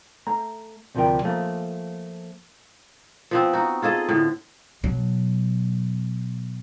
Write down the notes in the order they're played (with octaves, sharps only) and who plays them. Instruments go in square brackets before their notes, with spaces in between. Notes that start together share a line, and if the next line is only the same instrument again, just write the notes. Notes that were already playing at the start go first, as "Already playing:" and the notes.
[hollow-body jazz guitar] A3 A#5
D2 C3 F3 G3 A#4 G5
F3 A3 A#3
[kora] F3 B3 C4
D#4 F#4
F4 G#4 A4 D#5
A2 D3
[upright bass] B2 F#3